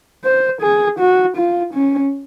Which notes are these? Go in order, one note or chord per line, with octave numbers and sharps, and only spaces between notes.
C5
G#4
F#4
F4
C#4